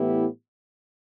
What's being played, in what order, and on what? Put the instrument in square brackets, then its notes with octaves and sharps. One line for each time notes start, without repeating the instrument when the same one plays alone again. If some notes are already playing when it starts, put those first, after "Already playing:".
Already playing: [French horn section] A2 E3 B3 E4 G4